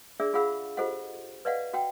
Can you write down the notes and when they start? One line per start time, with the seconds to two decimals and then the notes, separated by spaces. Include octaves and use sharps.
0.20 D4 G#4 D5 E5 E6
0.33 F4 G#4 F5 F#5 B5 E6
0.77 F4 G4 A4 C5 D#5 F#5
1.45 B4 D5 D#5 F5 F#5
1.73 F#4 F#5 G5